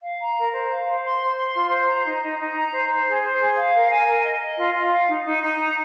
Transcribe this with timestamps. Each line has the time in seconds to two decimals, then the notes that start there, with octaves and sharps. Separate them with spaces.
0.03 F5
0.20 A#5
0.37 A#4
0.53 C5
0.70 F5
0.88 C5
1.04 C6
1.20 C5
1.38 C6
1.55 F4
1.71 C5
1.89 A#5
2.05 D#4
2.22 D#4
2.39 D#4
2.56 A#5
2.72 C5
2.89 C5
3.07 G#4
3.23 C5
3.39 G#4
3.57 F5
3.74 A#4
3.91 G#5
4.07 A#4
4.24 D#5
4.42 D#5
4.58 F4
4.75 F4
4.92 F5
5.09 D#4
5.25 D#4
5.42 D#4
5.59 A#5